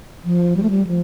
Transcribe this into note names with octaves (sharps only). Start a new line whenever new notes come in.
F3
G3
A3
G3
F3